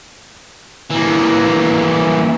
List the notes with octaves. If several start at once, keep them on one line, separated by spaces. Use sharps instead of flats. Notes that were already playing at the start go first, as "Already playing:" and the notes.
E3 A#3